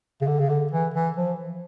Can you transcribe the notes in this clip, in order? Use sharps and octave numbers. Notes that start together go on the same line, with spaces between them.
C#3
D3
C#3
D3
E3
E3
F3